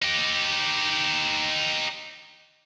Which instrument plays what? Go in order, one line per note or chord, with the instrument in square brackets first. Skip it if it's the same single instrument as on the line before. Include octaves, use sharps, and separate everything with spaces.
[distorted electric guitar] D#4 G4